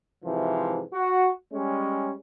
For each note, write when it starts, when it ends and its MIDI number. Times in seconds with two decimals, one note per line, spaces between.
0.25 0.81 44
0.25 0.81 48
0.25 0.81 52
0.25 0.81 53
0.92 1.29 66
1.52 2.13 55
1.52 2.13 56
1.52 2.13 61